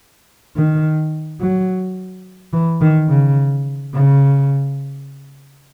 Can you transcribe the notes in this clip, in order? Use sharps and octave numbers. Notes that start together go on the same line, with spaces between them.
D#3
F#3
E3
D#3
C#3
C#3